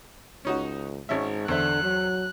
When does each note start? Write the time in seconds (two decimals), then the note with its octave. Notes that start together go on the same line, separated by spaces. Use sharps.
0.45 C#2 C#4 D#4 F#4
1.09 G#1 G#2 C#4 E5
1.48 E2 D3 C5 E5 F#6
1.83 F#3